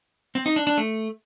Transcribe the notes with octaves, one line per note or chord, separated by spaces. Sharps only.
C4
D#4
D4
D4
A3